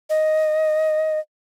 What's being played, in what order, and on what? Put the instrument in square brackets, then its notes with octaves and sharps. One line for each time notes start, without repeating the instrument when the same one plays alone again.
[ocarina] D#5